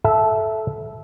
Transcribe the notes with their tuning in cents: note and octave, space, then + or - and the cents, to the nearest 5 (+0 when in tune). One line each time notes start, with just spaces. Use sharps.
A4 -15 E5 +0